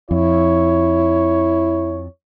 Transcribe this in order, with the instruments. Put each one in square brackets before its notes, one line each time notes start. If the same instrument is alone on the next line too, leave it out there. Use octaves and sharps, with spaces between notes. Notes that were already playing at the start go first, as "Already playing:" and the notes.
[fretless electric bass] F2 [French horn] E4 [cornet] C#5